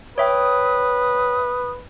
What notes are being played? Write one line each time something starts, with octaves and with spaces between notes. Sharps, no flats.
B4 C#5 E5 G5 D#6